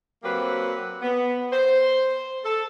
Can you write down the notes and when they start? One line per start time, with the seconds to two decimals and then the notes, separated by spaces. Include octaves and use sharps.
0.23 F#3 A#3 C4 G4 B4 C5
1.02 B3
1.52 C5
2.44 A4